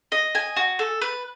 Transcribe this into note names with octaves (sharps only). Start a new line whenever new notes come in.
D#5
G#5
F#4
A4
B4